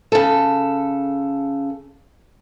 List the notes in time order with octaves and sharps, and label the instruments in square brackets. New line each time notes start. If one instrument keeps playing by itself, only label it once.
[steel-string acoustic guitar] C#3 A4